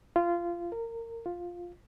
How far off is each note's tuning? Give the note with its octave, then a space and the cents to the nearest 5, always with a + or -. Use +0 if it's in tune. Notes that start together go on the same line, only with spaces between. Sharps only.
F4 -20
A#4 -25
F4 +5